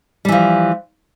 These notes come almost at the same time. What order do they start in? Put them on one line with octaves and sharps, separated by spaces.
G3 E3 F3